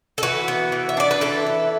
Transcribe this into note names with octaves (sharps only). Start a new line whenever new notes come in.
A4
E3 F#4 B4
B3
E3
E5
D4 D5
B4
E3 E4 A4
B3